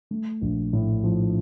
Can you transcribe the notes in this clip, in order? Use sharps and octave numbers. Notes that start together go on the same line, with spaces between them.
A3
A#1
A2
F3